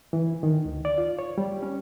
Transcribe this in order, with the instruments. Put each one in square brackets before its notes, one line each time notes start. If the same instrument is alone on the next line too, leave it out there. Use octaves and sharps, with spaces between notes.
[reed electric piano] E3
D#3
D2
D5
F4
C#5
G3
C#4